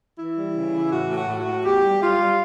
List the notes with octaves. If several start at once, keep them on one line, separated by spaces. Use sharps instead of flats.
E3 E4
G3
C#3
E3
A2 F#4
A2
F#4
A2
F#4
A2
E2 G4
G3
G3 F4
G3